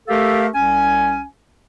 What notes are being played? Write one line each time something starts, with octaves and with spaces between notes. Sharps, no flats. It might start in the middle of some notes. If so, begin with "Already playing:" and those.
A3 G4 A4 A#4 F5
C2 C#4 G#5